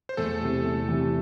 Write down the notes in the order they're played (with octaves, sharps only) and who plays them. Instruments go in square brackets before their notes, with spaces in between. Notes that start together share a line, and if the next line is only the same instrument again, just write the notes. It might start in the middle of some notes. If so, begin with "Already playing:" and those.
[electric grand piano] C5
[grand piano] E2 [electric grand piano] A3 A4
[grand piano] C3 E3
E2
C3 E3